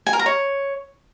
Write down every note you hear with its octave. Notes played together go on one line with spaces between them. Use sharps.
G#5
A#4
A#5
C#5